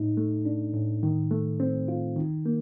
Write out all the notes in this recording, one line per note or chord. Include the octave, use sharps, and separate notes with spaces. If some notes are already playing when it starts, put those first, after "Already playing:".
Already playing: A2 D#4
A3
D4
A2
D#3
A3
C4
F4
D#3
A#3